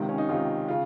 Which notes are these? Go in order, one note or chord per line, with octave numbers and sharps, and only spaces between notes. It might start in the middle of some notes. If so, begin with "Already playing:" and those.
Already playing: C#2 C3 D#3
C#4
D#4
C#2 C3 D#3 F4
C#3 F4